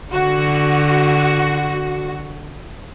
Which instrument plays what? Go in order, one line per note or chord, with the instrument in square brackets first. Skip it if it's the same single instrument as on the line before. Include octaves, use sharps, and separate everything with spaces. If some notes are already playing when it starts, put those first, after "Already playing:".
[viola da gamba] D3 [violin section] F#4